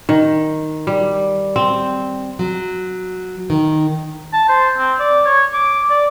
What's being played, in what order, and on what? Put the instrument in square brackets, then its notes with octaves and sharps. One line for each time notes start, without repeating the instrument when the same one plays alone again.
[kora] D#3
G3
C4
[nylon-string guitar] F#3
D#3
[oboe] A5
C5
C4
D5
C#5
D6
D5